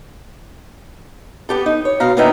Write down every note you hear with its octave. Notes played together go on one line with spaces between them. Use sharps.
B3 G4 A4
D#4
C#5
B2 F5 A#5
A#2 D3 D#3 B3 D#4 E4